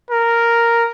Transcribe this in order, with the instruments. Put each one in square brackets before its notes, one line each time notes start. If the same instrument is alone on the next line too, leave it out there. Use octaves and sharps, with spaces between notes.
[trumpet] A#4